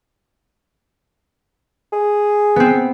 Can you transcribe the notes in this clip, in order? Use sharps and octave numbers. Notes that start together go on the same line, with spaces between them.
G#4
B3 C4